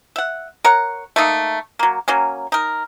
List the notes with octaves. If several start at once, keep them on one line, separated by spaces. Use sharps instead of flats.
E5 F#5
A#4 C#5 F#5
A3 A#3 D#4
F#3 A#3
F#3 A#3 C#4
D#4 A#4